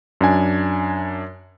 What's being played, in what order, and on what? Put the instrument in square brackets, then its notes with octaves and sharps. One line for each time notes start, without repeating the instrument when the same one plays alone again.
[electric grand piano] F#2 D4 G#5